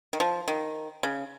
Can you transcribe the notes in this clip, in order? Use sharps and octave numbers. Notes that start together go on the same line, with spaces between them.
D#3
F3
D#3
C#3